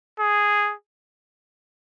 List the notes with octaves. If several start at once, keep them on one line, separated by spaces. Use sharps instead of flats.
G#4